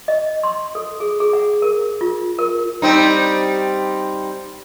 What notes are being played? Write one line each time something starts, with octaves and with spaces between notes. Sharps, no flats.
D#5
C6
A4
G#4
G#4
F#5
A#4
F4
A#4
G3 C4 D#4